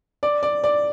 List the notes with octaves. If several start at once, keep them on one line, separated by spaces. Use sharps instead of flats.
D5
D5
D5